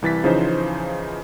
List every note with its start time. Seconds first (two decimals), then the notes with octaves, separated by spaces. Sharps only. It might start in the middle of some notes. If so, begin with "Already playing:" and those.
0.02 C2 E3 A6 B6
0.24 C#3 E3 F3 C#4 D#4 C5